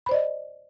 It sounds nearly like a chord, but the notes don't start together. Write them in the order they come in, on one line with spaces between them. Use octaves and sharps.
B5 C5 D5 D#5